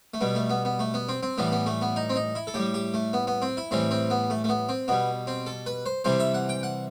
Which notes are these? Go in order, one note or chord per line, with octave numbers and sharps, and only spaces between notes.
A3
B2 G3 B3
A3
B3
B3
A3
B3
C4
C4
A2 E3 G3 B3
B3
A3
B3
D#4
C4
D#4
E4
A4
A2 G3 G4
G4
A3
B3
B3
C4
E4
A2 E3 G3 C4
C4
B3
A3
A3
B3
C4
B2 G3 B3
C4
A4
B4
C5
C3 E3 G3 C5
E5
F#5
G5
F#5